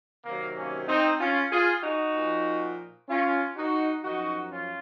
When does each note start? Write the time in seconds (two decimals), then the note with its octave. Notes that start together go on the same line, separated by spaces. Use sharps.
0.24 C3 D#3 F#3 A#3
0.56 A#3 C#4
0.87 C4 D#4
1.19 C#4 F4
1.51 F4 G#4
1.82 D#4 F#4
2.14 A#2 F3
3.09 C#4 F4
3.56 D#4 F#4
4.03 F#2 F3 D#4 F#4
4.51 C#4 F4